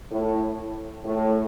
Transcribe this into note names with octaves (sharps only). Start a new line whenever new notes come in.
A2
A2